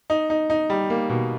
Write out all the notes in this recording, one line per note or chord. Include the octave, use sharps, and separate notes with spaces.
D#4
D#4
D#4
G3
A#3
B2